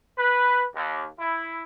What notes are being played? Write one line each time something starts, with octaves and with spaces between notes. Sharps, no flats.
B4
D#2
E4